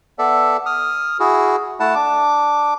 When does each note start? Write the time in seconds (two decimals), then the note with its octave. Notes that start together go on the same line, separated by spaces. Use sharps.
0.19 B3 A4 D5 E5
0.66 D#6 F6
1.20 E4 F#4 G#4
1.80 A3 E4 F#5 A5
1.95 D4 D6